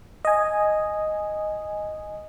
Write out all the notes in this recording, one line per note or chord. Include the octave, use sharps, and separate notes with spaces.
D#5 G#5